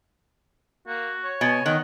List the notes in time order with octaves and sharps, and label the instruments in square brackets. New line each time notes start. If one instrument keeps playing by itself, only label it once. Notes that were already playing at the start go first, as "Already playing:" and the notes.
[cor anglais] A#3 [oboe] F#4
[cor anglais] C#5
[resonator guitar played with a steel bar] B2 [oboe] G#5
[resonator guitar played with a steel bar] D#3 [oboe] F#5